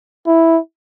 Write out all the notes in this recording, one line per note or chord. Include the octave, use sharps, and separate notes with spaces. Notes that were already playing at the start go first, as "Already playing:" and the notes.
E4